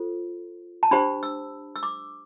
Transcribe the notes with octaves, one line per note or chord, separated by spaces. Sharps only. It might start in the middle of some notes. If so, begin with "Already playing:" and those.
Already playing: F4 A4 C5
A5
D4 G4 C5 B5
E6
E6
D6